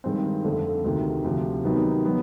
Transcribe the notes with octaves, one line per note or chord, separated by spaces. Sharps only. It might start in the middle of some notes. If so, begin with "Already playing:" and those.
G2 D#3 G#3 C4
F2 D3 F3 A3
D2 C3 D#3
D2 C3 F3
C3 D#3 F#3 B3 D#4
F#3 B3